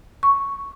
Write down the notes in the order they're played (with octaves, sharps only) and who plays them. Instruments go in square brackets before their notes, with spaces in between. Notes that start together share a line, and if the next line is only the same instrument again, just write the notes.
[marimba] C#6